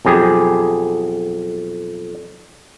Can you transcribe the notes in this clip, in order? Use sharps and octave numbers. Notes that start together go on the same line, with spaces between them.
B1 F2 G4 G#4